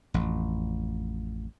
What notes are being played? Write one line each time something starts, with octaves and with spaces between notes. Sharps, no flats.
A1 F2